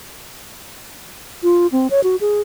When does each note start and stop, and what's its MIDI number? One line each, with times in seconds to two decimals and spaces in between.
1.43 1.67 65
1.72 1.87 60
1.90 2.01 73
2.04 2.16 66
2.21 2.41 68